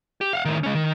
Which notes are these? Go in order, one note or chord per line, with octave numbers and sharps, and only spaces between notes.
G4
F5 F#5
A2 D#3
G#3 C#4
D#3